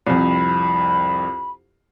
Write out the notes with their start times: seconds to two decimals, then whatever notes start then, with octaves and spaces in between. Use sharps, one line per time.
0.07 C2 F2 B5